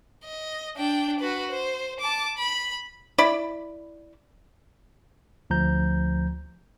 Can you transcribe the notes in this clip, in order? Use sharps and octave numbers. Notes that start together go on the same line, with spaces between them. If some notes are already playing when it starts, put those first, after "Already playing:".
D#5
D4 G5
F#4 B4
C5
A5 D6
B5
E4 D5 B5
D2 F3 A#5 G6